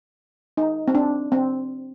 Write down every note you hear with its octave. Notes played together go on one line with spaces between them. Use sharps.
D#4
C4
D4
C4